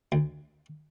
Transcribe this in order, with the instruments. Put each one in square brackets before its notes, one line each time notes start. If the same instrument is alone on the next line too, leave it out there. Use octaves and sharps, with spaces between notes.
[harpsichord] D2